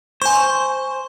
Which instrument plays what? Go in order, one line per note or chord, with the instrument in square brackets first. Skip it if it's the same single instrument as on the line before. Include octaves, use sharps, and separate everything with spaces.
[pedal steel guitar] C5 [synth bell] G#5 C#6